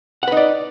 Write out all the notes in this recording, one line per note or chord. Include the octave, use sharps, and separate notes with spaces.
D#4 B4 D5 F#5